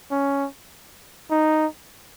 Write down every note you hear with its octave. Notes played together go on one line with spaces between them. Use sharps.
C#4
D#4